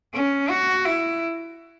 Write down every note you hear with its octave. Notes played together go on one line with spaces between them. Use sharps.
C#4
F#4
E4